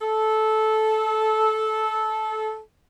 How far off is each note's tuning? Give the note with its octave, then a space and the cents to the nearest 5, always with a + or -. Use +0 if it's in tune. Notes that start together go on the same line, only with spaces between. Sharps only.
A4 -15